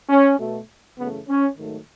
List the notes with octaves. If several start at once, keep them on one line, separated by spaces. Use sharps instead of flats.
C#4
B2 A3
F#2 C#3 E3 A3 B3
C#4
G#2 D#3 F#3 A3